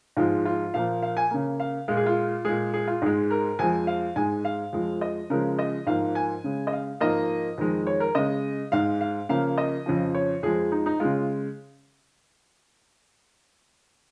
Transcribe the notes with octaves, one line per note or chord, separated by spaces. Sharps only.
G#2 F3 G#3 F4
F4
A#2 F3 A#3 F5
F5
G#5
C#3 A#3
F5
A#2 G#3 F4
G#4
F4
A#2 G#3 G#4
G#4
F4
G#2 G#3 G#4
A#4
F2 F3 G#3 G#5
F5
G#2 G#3 G#5
F5
F2 F3 G#3
D#5
C#3 F3 G#3 A#4
D#5
G#2 F3 A#3 F5
G#5
C#3 G#3
D#5
F5
G#2 F3 A#3 D#5
F2 D#3 G#3
C#5
A#4
C#3 G#3 D#5
G#2 G#3 F5
F5
C#3 F3 A#3 F5
D#5
F2 C#3 F3
C#5
F2 F3 G#3 G#4
D#4
D#4
C#3 G#3 F4